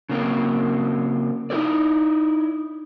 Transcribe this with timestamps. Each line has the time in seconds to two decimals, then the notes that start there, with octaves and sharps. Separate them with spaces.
0.09 C#3 A#3 C4
1.50 D#4 E4 F#4 A#4 D5